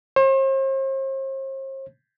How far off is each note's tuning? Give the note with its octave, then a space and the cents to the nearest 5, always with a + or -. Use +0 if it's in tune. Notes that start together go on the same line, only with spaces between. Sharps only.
C5 +45